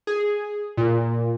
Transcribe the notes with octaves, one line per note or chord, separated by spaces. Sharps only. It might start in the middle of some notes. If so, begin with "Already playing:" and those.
G#4
A#2